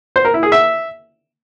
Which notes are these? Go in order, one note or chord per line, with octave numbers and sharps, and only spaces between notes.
C5
A#4
E4
G#4
E5